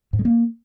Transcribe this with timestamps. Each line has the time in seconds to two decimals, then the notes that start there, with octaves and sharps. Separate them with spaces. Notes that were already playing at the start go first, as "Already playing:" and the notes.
0.13 G#2
0.19 G#3
0.25 A#3